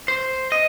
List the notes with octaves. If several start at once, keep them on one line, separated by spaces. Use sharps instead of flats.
C5
D#5